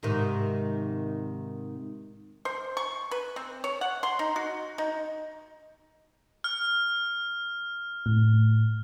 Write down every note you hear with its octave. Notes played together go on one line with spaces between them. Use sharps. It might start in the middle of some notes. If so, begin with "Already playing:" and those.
G#2 C3 D#3
C5
C#6
B4
C4
C#5
F#5
C6
D#4
F#4
D#4
F6
A2